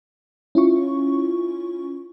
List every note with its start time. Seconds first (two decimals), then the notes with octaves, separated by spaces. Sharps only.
0.55 C#4 E4 F4 C#6